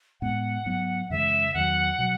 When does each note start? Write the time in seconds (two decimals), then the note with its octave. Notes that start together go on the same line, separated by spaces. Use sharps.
0.21 A2 G#3 B3 F#5
0.66 G#2 F#3 B3
1.10 F#2 C#3 E3 G#3 E5
1.54 E2 D#3 F#3 F#5
1.99 B2 F#3